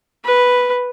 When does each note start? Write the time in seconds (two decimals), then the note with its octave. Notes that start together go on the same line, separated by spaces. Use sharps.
0.25 B4